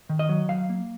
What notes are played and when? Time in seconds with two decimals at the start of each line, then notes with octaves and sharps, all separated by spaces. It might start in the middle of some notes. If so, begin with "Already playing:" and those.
0.09 D#3
0.19 D#5
0.29 F#3
0.49 F#3 F5
0.70 A#3